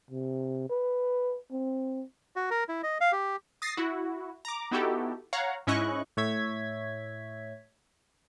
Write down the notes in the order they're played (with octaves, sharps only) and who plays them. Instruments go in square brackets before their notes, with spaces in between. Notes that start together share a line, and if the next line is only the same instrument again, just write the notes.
[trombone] C3
B4
C4
[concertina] F#4
A#4
E4
D#5
F5
G4
[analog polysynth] D#6 A6 A#6 C7
E4 F#4
A#5 D6
B3 D#4 E4 F#4 G4 A4
C#5 F5 F#5 A#5
G#2 C#4 E4 D#5 C#6 F#6
[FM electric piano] A2 C#5 E5 G#6 B6